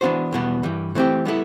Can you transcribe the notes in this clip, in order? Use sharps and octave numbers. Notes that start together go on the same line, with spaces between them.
E3 B3 D4 F#4 C5
E2 B2 G3 B3
G2 E3 G3
E3 A3 C4 G4
G3 B3 E4 A4